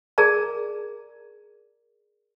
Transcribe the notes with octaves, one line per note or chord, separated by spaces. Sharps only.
G#4 A#4 D5 A5 A#5